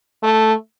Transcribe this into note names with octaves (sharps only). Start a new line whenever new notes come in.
A3